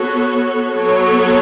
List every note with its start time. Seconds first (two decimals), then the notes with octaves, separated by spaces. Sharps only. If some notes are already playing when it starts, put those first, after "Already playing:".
Already playing: B3 F#4 A4 C#5
0.75 F#3 B3 A4 C#5